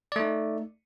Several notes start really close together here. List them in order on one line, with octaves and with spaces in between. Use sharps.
D5 A3 D#4